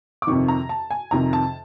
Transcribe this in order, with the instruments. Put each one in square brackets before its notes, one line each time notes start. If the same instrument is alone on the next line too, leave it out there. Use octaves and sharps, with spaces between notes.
[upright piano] D6
F2 C3 D#3 C#6
A#5
A5
G#5
F2 C3 D#3 A#5
A5